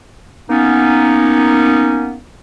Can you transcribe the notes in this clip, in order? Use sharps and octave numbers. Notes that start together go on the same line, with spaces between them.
A#3 B3 C#4 D#4